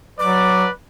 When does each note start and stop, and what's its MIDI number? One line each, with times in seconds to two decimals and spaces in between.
0.20 0.66 54
0.20 0.72 71
0.20 0.72 74
0.20 0.63 86